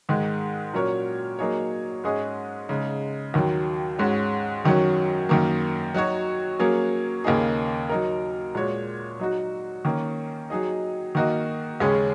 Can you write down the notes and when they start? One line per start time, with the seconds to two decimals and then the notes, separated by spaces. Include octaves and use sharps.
0.09 G#2 D#3 G#3
0.74 A#2 F#3 C#4 A#4 C#5
1.39 F#3 A#3 D#4 G#4 C#5
2.04 G#2 G#3 C#4 G#4 D#5
2.69 C#3 G#3 D#4
3.34 D#2 D#3 F#3
3.99 G#2 G#3 C#4 F#4
4.64 F#2 D#3 F#3 C#4
5.29 F#2 D#3 A#3
5.94 F#3 D#4 F#4 C#5
6.59 F#3 A#3 C#4 G#4 C#5
7.24 D#2 C#3 A#3 D#4 G#4
7.89 F#3 D#4 A#4
8.55 A#2 G#3 F#4 C#5
9.19 F#3 D#4 F#4
9.85 D#3 A#3 C#4
10.50 F#3 D#4 G#4 D#5
11.15 D#3 A#3 F#4 D#5
11.80 D#2 C#3 G#3 C#4 G#4